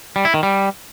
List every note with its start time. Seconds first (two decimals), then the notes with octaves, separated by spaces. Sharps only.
0.16 G3
0.25 E4
0.34 D#3
0.43 G3